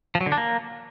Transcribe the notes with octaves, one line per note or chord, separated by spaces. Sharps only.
F3
F#3
D3
D4
A#3